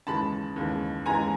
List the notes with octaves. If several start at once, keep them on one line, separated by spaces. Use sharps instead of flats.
D#2 C#3 E3 G#3 A5 B5
D#2 C#3 E3 G#3
D#2 C#3 E3 G#3 G#5 A#5